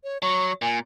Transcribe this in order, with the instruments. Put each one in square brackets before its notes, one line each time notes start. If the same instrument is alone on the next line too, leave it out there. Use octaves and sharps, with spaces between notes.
[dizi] C#5
[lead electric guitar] F#3 [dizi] C#6
[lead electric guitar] A#2 [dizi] G#5